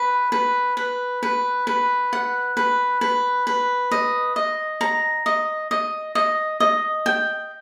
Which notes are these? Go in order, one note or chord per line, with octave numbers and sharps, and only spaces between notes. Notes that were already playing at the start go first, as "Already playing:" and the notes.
Already playing: B4
B4
B4
B4
B4
F#5
B4
B4
B4
D#5
D#5
A#5
D#5
D#5
D#5
D#5
G5